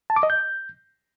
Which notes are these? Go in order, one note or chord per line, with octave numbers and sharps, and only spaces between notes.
A5
D6
D#5
G6